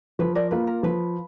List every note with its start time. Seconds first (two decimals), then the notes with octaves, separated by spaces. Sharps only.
0.19 F3 B4
0.35 A#4 D5
0.51 A#3 F4 B4
0.67 A#4
0.83 F3 B4